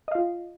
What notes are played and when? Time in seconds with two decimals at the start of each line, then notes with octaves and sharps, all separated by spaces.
0.08 D#5
0.12 F5
0.15 F4